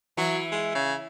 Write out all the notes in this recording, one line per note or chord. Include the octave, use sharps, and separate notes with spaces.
E3 F#3
G#3
C#3